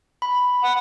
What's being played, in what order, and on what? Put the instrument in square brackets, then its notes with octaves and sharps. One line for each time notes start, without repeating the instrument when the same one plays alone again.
[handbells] B5
[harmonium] F#5